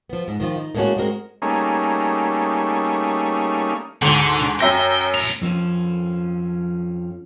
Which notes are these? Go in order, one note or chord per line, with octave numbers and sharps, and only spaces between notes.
F3 B3
G#2
D#3 F3 F4
D#4
A2 G#3 A#3 B3 C#4 F#4
G#3 C4 F#4 A#4
G3 A3 A#3 C#4 D#4 G#4
D2 G#2 D3
F#2 E5 G5 A#6
A2 A#5
F2 F3 C#4